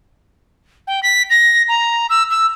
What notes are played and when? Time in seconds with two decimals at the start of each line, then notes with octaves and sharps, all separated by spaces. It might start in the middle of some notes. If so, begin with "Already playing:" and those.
0.87 G5
1.03 B6
1.30 A#6
1.69 A#5
2.10 E6
2.31 E6